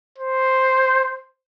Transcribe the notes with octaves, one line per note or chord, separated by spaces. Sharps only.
C5